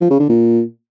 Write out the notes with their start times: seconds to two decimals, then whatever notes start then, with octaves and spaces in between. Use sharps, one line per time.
0.01 F3
0.10 C#3
0.20 D3
0.29 A#2